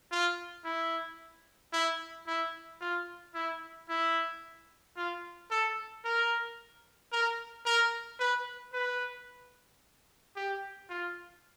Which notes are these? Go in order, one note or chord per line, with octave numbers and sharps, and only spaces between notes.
F4
E4
E4
E4
F4
E4
E4
F4
A4
A#4
A#4
A#4
B4
B4
G4
F4